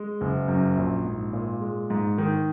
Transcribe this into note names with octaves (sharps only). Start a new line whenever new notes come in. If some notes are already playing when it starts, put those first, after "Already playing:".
Already playing: G#3
F#1
F#2
A#1
G#2
A#2
G#3
G#2
D#3